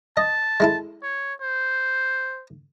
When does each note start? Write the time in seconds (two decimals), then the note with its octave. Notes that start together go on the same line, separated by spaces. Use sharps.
0.17 D#5 A5
0.60 G#3 E4 A4
1.03 C#5
1.41 C5